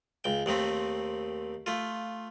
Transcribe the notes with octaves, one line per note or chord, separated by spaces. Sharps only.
C#2 G5
D#2 D#3 A3 C4
A3 F4